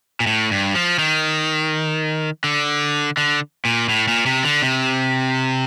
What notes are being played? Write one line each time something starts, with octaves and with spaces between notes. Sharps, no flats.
A#2
A2
G2
F3
D#3
D3
D3
A#2
A2
A#2
C3
D3
C3